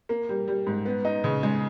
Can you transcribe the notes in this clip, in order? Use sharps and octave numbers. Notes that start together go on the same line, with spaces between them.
A#3
G3
G3
G#2
B3
D#4
C#3
G#3